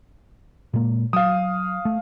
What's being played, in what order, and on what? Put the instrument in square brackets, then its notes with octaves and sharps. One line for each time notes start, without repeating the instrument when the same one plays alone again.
[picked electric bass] A#2 G#3 A#3
[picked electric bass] F#3 [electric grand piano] F5 D#6
[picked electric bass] A3